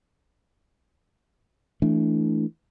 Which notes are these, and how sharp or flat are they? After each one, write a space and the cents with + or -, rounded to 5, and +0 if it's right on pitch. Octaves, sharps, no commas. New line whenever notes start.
E3 +0 A3 +0 D4 -10